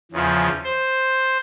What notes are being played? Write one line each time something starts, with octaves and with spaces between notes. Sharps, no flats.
E2 C#3 F3
C5